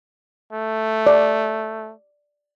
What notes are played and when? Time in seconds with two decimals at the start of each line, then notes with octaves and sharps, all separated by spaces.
0.53 A3
1.07 D5